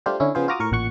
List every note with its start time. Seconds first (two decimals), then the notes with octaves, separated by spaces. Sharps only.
0.06 G3 A3 D4 F4 G4 C5
0.20 D3 C#4 E4
0.35 C#3 F3 B3 F4 G#4 C5
0.48 F4 F#4 A#5 D6 D#6
0.60 A2 A#4 C#6
0.71 A1 A#2 F#5 C#6